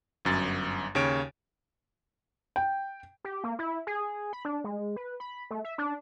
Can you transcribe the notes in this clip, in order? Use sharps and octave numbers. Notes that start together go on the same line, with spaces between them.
G1 F#2 A6
D#2 C#3 C#5 D7
G5
G4
A#3
E4
G#4
B5
D4
G#3
B4
B5
A3
E5
D4